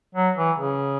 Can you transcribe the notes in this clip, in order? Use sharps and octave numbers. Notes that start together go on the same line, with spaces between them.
F#3
E3
C#3